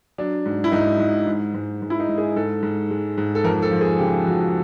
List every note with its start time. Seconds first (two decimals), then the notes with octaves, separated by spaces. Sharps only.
0.18 F#3 D4
0.46 G#2
0.64 E4
0.72 G#2 D#4
0.99 G#2
1.27 G#2
1.54 G#2
1.82 G#2
1.90 E4
2.00 D#4
2.08 G#2
2.18 G#4
2.36 G#2 A4
2.63 G#2
2.91 G#3
3.18 G#2
3.35 A4
3.44 F2 A#4
3.62 A4
3.71 F3
3.81 G#4
3.99 C#3 G4
4.26 F2 F#4